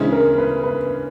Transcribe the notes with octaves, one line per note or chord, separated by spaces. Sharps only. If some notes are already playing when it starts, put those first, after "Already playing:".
Already playing: D2 C#3 E3 G#3
A#4
B4
B4